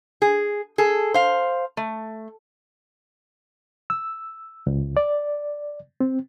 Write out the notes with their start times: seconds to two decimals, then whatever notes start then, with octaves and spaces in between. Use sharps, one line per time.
0.22 G#4
0.78 G#4 A4
1.14 C5 F5
1.77 A3
3.90 E6
4.67 C#2
4.97 D5
6.01 C4